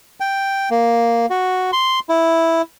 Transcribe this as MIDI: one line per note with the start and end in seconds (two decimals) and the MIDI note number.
0.20 0.69 79
0.70 1.26 58
1.30 1.71 66
1.73 1.99 84
2.09 2.62 64